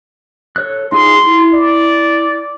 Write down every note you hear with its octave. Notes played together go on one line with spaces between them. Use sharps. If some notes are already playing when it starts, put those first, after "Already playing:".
A4 C#5 F#6
D#4 F4 G#4 C6
E4
D5